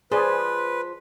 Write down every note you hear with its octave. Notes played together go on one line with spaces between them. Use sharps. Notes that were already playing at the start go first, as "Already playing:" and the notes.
F3 G#4 B4 C5 D5